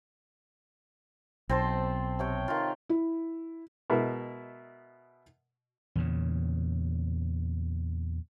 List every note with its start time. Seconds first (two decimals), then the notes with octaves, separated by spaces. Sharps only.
1.49 B1 C4 C5 A5
2.19 C3 C#5 G5
2.48 D#3 F4
2.89 E4
3.90 B2 G#3 E4 A#4
5.95 E2 A#2 C#3